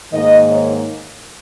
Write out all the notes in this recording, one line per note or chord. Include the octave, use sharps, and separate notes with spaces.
G#2 D#3 A#3 D#5
C#5